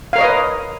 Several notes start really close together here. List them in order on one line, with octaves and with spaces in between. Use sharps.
F5 A#4 C#5 D#5 B4